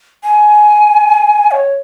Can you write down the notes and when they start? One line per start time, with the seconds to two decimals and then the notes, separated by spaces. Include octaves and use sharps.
0.24 G#5
1.51 C#5